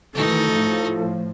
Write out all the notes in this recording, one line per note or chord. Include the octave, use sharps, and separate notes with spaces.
D#3 E3 A3 D#4 F#4 A4
A2 F3